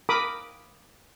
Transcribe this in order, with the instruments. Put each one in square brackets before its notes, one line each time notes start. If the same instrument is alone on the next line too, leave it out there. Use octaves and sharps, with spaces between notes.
[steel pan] A#4 B5 D6 D#6